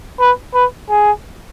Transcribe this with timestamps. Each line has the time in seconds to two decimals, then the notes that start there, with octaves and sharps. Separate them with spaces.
0.20 B4
0.55 B4
0.90 G#4